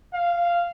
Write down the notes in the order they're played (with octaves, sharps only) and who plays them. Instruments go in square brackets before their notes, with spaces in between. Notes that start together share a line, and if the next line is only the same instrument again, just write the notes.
[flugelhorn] F5